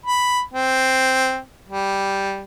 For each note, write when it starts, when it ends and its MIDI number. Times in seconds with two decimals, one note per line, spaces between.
0.06 0.41 83
0.54 1.39 60
1.69 2.44 55